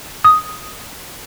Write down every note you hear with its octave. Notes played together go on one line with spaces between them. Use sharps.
D#6